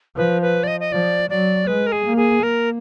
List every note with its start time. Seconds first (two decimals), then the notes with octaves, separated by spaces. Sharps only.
0.17 F3 B4
0.42 B4
0.63 D5
0.67 D#5
0.80 D#5
0.92 F3 D5
1.30 F#3 D5
1.67 G#3 B4
1.87 A#4
1.92 G#4
2.05 A#3
2.17 G#4
2.43 A#3 A#4